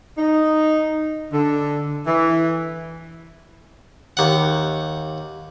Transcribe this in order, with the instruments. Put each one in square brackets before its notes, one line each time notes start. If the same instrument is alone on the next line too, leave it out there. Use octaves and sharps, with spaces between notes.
[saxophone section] D#4
D3
E3
[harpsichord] D#2 F#5